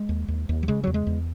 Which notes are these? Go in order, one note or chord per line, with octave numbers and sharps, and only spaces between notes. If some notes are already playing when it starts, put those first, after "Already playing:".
Already playing: G#3
D#2
D#2
D#2
F#3
C#3 G#3
E2 F#3
G#3
E2